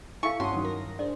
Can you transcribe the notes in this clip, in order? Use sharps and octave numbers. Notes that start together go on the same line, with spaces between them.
E4 A4 E5 F5 G#5 C#6
G2 C#4 F#4 F#5 A5 C6 D#6
D#3 F#3 C#4
A#4 A#6
D4 G#4 C5 D5